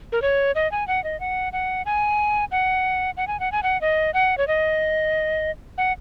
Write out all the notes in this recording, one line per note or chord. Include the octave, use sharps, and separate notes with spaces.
A#4
C#5
D#5
G#5
F#5
D#5
F#5
F#5
G#5
F#5
F#5
G#5
F#5
G#5
F#5
D#5
F#5
C#5
D#5
F#5